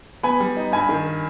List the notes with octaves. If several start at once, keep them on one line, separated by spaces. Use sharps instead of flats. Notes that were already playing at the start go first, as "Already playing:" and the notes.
B3 G#5 B5
G3
D#4
G2 G#5 B5
D#3